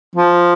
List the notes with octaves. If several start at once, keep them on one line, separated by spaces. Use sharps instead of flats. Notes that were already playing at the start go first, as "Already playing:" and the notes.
F3